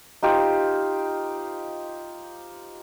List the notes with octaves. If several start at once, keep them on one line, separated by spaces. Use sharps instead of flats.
D#4 F4 G4 C5